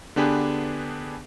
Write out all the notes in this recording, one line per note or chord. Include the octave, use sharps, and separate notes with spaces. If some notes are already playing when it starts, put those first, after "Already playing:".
D3 B3 D4 G4 G#4 B4